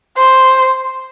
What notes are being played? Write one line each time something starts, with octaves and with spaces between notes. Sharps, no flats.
C5